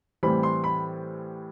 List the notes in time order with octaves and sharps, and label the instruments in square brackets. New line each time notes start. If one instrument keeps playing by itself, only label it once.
[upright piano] A2 E3 G3 C4 [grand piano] B5
[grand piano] C6
B5